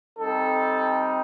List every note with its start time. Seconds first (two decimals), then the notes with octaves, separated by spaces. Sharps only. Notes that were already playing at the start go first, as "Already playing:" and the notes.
0.18 G3 C4 D#4 A4